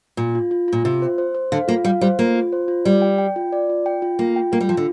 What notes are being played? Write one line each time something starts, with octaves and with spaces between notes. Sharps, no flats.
A#2 F4
F4
F4
A#2 F4
C3 F4
C5
C5
C5
D3 F5
A#3 F4
G3 F5
G3 C5
A#3 F4
F4
C5
F4
G3 D5
G5
G5
F4
D5
F4
G5
F4
A#3 F4
G5
A#3 F4
G3
F3 F4
D3